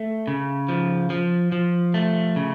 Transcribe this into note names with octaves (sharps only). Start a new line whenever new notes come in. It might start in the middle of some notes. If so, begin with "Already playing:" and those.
Already playing: A3
C#3
F3
F3
F3
A3
C#3